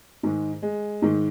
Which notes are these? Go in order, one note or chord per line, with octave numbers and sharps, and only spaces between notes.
G#2 D#3 G#3
G#3
G#2 D#3